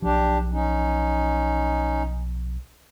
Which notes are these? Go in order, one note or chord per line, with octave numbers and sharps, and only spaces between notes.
B1 F3 D4 G4
C#4 D#4